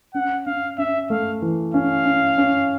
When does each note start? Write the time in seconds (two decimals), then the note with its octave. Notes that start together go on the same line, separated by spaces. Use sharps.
0.14 C#4 F#5
0.46 C#4 F5
0.78 C#4 E5
1.10 A3 F5
1.42 E3
1.74 C#4 F5
2.05 C#4
2.38 C#4